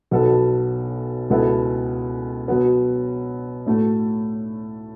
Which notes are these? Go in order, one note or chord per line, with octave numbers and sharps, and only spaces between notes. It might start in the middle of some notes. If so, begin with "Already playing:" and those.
B1 B2 F#3 B3 A4
C#2 B2 B3 E4 A4
B2 F#3 B3
A2 A3 F#4 A4